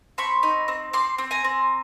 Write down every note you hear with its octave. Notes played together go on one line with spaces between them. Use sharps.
C4 B5 C#6
D#4
C4
C4 C6 D6
C4
G#5 A#5
C4